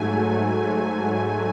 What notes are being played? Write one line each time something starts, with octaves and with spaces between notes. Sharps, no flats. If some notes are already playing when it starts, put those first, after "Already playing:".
Already playing: G#2 F#3 A3 G#5